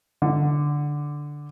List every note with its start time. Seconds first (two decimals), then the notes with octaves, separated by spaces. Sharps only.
0.22 D3